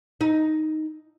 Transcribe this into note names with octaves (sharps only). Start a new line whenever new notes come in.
D#4